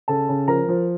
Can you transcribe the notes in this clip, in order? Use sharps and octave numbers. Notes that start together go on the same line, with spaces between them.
C#3 A4 A5
C#3
F3 A#4 A#5
F3